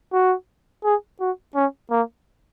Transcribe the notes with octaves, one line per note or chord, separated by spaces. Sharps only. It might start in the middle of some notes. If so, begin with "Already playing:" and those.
F#4
G#4
F#4
C#4
A#3